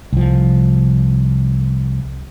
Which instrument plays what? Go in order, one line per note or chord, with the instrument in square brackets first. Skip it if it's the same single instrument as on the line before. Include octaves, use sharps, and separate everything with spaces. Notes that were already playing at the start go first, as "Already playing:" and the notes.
[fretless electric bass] C2 F3